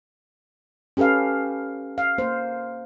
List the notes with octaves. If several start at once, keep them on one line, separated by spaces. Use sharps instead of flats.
C#4 G4 A4 B4 F5
F5
A#3 C5